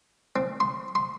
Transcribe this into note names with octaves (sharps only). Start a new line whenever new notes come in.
C4
C6
C6